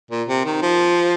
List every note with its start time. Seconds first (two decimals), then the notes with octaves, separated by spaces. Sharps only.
0.11 A#2
0.28 C3
0.45 D#3
0.62 F3